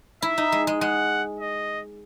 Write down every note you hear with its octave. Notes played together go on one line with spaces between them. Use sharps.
E4 E5
D#4
G#3
G#3
G#3 F#5
D#5